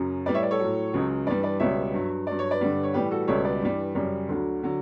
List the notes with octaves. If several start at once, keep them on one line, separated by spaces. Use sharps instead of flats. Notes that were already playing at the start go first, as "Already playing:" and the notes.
Already playing: F#2 C#3 F#3
A2 G3 B4 D5
C#5 E5
B4 D5
A4 C#5
A2 F#3
C#2 C#3 F#3
G2 E3 G3 B4 D5
B4 D5
C#2 B2 G3 C#5 E5
G2 F#3
G2 F#3 D5
C#5
B4 D5
G2 D3 G3
C#5
A2 E3 G3 G4 B4
F#4 A4
C#2 B2 G3 A4 C#5
B4 D5
G2 E3 G3
F#2 C#3 G3
D2 D3 F#3
D3 F#3